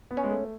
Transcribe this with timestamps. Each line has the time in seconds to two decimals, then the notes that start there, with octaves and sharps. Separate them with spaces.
0.11 B3
0.17 C#4
0.24 G#3
0.31 A3